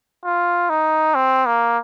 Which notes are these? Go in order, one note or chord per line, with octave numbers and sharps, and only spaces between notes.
F4
D#4
C4
A#3